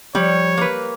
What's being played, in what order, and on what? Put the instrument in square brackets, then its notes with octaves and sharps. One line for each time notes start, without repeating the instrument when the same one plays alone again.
[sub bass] F3 [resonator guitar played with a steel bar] G3 [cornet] C#5
[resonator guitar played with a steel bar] A#3 B4